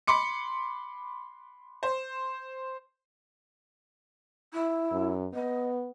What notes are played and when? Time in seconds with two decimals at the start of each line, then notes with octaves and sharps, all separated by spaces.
0.07 B5 C6 D6 C#7
1.83 C5
4.52 E4
4.92 F#2
5.34 B3 D#5